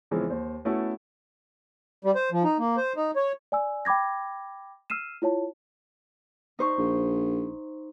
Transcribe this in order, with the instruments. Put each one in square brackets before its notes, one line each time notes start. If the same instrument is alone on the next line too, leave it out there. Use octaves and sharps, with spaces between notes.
[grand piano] E2 C#3 E3 F3 G#3 C4
D#2 C5
A3 B3 C#4 E4 F#4 A4
[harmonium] G3
C5
F3
D#4
A#3
C5
D#4
C#5
[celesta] D5 G#5 E6
G5 B5 D6 G#6 A#6
E6 F6 C7 D#7 E7
E4 F4 C#5 A5
[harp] D#4 C5 C#6
[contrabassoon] A#1